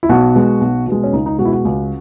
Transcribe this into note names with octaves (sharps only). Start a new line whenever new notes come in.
E4
B1 F#4
B2 G#3
B1
B2 G#3
C#4
C#2 D#4
D#4
B2 G#3 F#4
E4
F#4
C#2